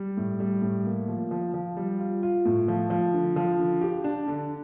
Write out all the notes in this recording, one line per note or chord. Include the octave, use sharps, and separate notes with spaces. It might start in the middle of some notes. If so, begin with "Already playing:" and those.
Already playing: G3
A2
G3
A2
A#3
F3
F3
F3
G3
F4
F4
A2
F3
F3
D3
F3
D3
G4
D4
D3